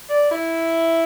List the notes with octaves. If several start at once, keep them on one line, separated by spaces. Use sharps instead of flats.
D5
E4